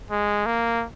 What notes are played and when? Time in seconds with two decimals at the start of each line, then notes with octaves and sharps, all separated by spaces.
0.10 G#3
0.46 A#3